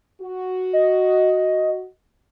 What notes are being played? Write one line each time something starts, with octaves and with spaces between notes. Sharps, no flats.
F#4
D#5